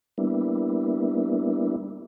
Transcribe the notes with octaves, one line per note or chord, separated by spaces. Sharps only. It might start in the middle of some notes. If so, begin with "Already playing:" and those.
G3 A#3 B3 D4 E4